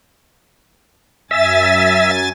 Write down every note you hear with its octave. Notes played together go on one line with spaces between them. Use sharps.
F#2 E5 G#5 A6